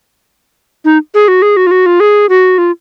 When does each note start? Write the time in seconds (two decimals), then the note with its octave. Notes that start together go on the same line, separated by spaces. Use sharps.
0.85 D#4
1.14 G#4
1.28 F#4
1.42 G#4
1.57 F#4
1.67 F4
1.71 F#4
1.86 F4
2.00 G#4
2.29 F#4
2.58 F4